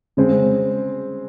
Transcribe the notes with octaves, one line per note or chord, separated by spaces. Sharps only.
C#3 G#3 C4